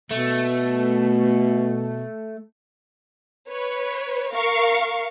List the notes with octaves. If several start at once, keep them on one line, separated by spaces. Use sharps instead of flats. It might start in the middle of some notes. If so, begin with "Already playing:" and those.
B2 A3
B4 C#5
A#4 F5 C#6